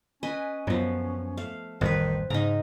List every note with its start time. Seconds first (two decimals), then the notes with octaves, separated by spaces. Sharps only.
0.23 C#4 B4 D#5 G#5
0.67 F#2 F3 F#3 B3
1.37 A3 F5
1.81 A1 F2 D#3 G3 C4 B4
2.30 G#2 C#3 D#4 A#5